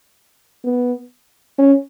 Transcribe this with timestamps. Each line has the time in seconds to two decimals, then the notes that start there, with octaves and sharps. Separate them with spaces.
0.65 B3
1.58 C#4